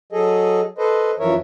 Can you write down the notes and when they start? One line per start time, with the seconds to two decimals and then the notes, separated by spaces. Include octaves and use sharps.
0.12 F#3 G#4 A4 D#5
0.78 A4 B4 C5 D#5
1.20 F#2 E3 F3 A#4 C#5 E5